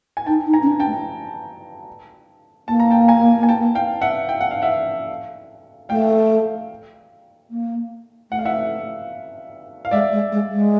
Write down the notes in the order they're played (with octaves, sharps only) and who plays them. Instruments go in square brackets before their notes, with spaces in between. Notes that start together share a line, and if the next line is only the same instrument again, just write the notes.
[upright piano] G#5
[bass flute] D#4 [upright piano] G5 A5
[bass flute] D#4
[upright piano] G#5 A#5
[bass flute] C#4
D4
[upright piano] G5 A5
[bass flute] A3
[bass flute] A#3 [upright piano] A5
[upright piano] A#5
G5 A5
G#5 A#5
G#5
G5 A5
F5 G5
E5 F#5
G5
F#5
F5
E5 F#5
[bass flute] A3 [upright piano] F5 G5
[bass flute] A#3
[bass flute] A3 [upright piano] F#5
[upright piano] F5
E5 F#5
F5
[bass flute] G#3 [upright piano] D5 E5
[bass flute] G#3
G#3
G#3